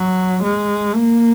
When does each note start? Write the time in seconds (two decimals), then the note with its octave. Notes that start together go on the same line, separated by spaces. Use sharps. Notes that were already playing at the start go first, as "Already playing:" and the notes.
Already playing: F#3
0.43 G#3
0.95 A#3